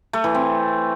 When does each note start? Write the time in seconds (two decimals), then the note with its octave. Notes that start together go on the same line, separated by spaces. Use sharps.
0.13 A3
0.24 E3
0.35 C4